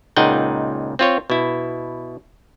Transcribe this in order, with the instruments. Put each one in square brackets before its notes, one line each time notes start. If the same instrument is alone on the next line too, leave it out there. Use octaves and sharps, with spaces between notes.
[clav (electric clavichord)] C#2 A#2 D#4 G#4 F#5 G5
C4 F4 C#5
B2 E4